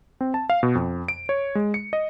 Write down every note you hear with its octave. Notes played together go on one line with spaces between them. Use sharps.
C4
A5
F5
B2
F2
D7
C#5
G#3
C#7
D#5